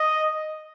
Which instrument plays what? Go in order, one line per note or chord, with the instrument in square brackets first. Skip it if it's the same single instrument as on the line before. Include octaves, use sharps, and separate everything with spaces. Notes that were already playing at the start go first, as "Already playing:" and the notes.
Already playing: [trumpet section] D#5